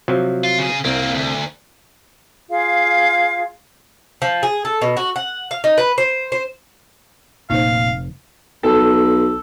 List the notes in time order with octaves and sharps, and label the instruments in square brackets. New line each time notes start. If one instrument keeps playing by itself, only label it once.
[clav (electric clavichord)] C3 F3 F#3
[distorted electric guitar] F4
C#3 G#4
[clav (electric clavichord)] C2 [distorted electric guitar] A#3 C4
[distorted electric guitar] D2
[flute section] F4 G#4 F5
[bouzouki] F3
G#4
A4
B2
F#4
F#5
F5
D#4
B4
C5
C5
[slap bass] F1 [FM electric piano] A#2 [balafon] D#4 C5 [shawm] F5
[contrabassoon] B1 [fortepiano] A4